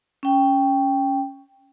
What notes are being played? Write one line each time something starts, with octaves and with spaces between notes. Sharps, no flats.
C#4 G5